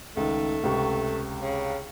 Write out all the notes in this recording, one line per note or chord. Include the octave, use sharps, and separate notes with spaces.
C#2 D#3 A3
C#2 C3 C#6
C#3